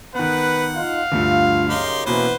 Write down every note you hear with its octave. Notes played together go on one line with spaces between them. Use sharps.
D#3 B3 B4 F#5
D#4 F4 F5
D2 G2 A3 F4
F#2 C#3 D#4 G4 C6
B2 E3 A#3 B3 C#4 B4 C5